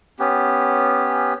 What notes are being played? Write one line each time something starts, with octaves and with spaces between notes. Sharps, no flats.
B3 C#4 G4